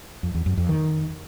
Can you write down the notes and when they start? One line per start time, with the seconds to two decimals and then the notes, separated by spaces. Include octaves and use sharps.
0.23 F2
0.35 E2
0.46 F#2
0.57 F2
0.69 D#3